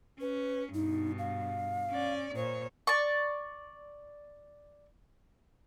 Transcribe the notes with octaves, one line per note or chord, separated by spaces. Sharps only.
C#4 B4
G2 B2 D#4
F5
C#4 D5
A#2 C5 C#5
D5 C#6